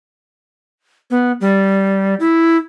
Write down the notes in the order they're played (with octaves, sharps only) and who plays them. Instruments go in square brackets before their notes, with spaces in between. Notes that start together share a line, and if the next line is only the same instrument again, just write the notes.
[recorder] B3
G3
E4